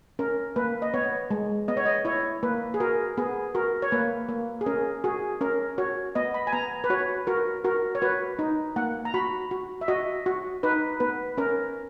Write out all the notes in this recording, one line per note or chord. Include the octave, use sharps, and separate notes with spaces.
C#4 A#4
A#3 B4
D#5
B3 C#5
G#3
B3 D#5
C#5
D#5
E4 C#5
A#3 B4
G#4
F#4 A#4
B3 G#4
F#4 A#4
C#5
A#3 B4
A#3
G#4
C#4 A#4
F#4 G#4
C#4 A#4
F#4 C#5
B3 D#5
B5
G#5
B3 A#5
B4
F#4 C#5
F#4 A#4
F#4 A#4
C#5
F#4 B4
D#4
A#3 F#5
A#5
F#4 B5
F#4
E5
F#4 D#5
F#4
D#4 B4
B3 B4
C#4 A#4